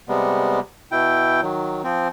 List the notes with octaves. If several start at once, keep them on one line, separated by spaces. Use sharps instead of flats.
C3 G3 G#3 B3
B2 E4 G5
D#3 F#3
F3 C4